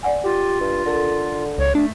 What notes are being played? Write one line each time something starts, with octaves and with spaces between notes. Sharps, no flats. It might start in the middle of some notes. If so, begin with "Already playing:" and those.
D5 F#5 G#5
F4 G4
G2
D3 A4 A#4
C#2 C#5
A3 D4